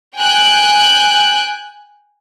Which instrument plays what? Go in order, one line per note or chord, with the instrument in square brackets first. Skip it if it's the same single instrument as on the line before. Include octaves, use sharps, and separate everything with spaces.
[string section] G5 G#5 F#6 G6